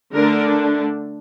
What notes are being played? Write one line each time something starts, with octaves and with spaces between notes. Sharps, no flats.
D3 A3 D4 A#4